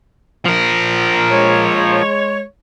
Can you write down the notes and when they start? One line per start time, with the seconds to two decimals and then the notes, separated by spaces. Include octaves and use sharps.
0.46 F3 A#4
1.31 G#3 C#5